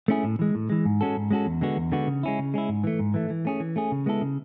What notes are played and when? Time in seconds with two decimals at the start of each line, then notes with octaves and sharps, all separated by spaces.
0.08 A3 C#4 E4 G#4
0.24 A2
0.39 E3 G#3
0.55 A2
0.70 E3 G#3
0.85 G#2
1.01 G#3 C#4 F#4 A4
1.16 G#2
1.31 G#3 C#4 F#4 A4
1.46 E2
1.61 D3 G#3 B3 F#4
1.77 E2
1.92 D3 G#3 B3 F#4
2.07 C#3
2.23 G#3 C#4 E4
2.39 C#3
2.54 G#3 C#4 E4
2.69 G#2
2.84 E3 A3
2.99 G#2
3.14 E3 A3
3.30 E3
3.45 A3 C#4 G#4
3.60 E3
3.76 A3 C#4 G#4
3.92 C#3
4.06 G#3 B3 E4 A4
4.21 C#3